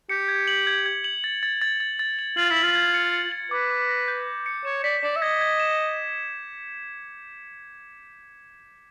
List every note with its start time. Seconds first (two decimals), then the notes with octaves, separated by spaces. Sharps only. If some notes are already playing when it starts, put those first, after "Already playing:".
0.09 G4 C#7
0.28 G#6
0.48 F#7
0.67 G#6
0.86 G#6
1.04 F#7
1.24 A6
1.43 A6
1.61 A6
1.80 A6
1.99 A6
2.19 F#7
2.37 F4 F#7
2.50 E4
2.56 F#7
2.63 F4
2.75 G#6
2.94 C#7
3.14 C#7
3.32 F#7
3.51 B4 D6
3.71 D6
3.89 A#6
4.08 G6
4.27 A#6
4.46 C#7
4.65 C#5 E7
4.84 D5 B6
5.03 D5 E7
5.16 E5
5.22 D#5 G#6
5.41 G#6
5.60 E7